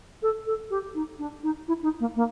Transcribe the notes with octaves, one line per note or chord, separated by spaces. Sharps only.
A4
A4
G4
D#4
D4
D#4
E4
D#4
A#3
A#3